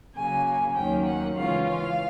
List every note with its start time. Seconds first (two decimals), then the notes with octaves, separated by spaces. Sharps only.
0.15 C#3 F#3 A#3 G#5
0.75 D#2 D#3 F#3 A#3 C#4 G5
1.06 F#5
1.35 C#3 E3 G#3 C#4 F4 F5
1.66 F5